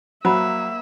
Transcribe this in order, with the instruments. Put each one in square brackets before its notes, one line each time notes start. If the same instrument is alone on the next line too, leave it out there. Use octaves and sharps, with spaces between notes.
[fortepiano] F#3 [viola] A#3 E5 [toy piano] C5 F#5 B5